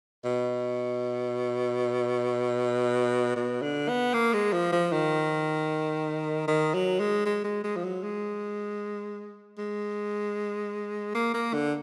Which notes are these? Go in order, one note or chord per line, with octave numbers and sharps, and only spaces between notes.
B2
B2
D3
B3
A#3
G#3
F3
F3
D#3
D#3
F#3
G#3
G#3
G#3
G#3
F3
F#3
G#3
G#3
A#3
A#3
D3